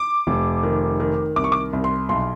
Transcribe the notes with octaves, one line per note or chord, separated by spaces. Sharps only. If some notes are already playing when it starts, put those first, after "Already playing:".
Already playing: D6
F1
D#3
D#3
C2 D6
C#6
D6
C2
C6
B1 C6